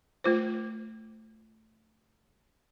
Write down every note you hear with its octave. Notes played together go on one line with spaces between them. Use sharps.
A3 F4 C5